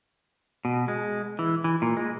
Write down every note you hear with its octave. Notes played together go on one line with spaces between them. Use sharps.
B2
G#3
E3
E3
A#2
G#3